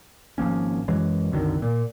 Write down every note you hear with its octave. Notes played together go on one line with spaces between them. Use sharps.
G#1 F3 A#3 C#4
F#2 E3 F#3 G#3
C2 F#2 D3 D#3
A#2